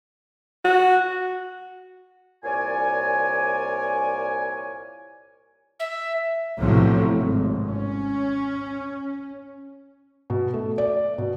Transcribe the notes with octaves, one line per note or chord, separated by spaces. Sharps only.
F#4
C2 A#2 C#5 D5 G#5
E5
B1 A2 C3 F3 F#3
G#1
C#4
B2
A3
D5
B2